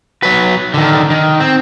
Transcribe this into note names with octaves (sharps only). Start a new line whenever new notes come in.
F#3 B4
D3 D#3
D#3
C4